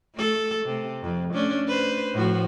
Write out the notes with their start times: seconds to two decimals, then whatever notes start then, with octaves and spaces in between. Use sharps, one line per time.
0.15 A3 A4
0.66 C3
1.03 F2
1.34 A3 C#4 D4
1.68 B4 C5
2.13 A2 F3 F#4